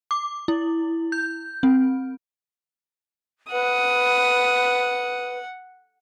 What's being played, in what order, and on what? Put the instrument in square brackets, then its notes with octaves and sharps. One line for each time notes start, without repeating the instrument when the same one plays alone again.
[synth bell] D6
E4
G6
C4
[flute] B4 [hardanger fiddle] F#5 [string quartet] D#6